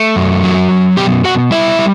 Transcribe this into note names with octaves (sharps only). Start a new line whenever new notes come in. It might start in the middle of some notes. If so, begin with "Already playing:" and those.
Already playing: A3
F#2
F#3
F#2
B2 G4 G5
B2 F#4 F#5
G3 E4 E5
G3